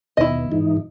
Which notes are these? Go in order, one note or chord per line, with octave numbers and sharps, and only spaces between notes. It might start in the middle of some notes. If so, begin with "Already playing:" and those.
D#2 B2 E4 D#5
G#2 E3 D#4